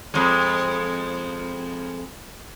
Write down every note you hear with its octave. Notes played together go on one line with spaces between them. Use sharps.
F2 G#3